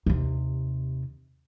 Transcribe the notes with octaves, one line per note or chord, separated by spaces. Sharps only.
D#2 C3